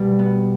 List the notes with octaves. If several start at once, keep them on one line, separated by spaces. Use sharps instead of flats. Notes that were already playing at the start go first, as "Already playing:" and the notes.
Already playing: B2 G3
B3